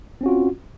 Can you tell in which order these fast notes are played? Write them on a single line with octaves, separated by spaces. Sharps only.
C4 C#4 F#4 F4